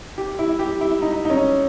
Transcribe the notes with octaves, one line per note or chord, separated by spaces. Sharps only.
G4
E4
G4
E4
D#4
D#4
C#4